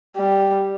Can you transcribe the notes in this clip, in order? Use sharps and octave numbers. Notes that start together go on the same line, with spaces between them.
G3